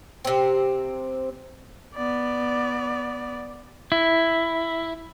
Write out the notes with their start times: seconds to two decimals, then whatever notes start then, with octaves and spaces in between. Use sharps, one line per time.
0.25 C3 C4
1.96 B3 D5
3.92 E4